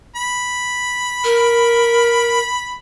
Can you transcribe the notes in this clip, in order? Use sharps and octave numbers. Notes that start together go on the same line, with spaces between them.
B5
A#4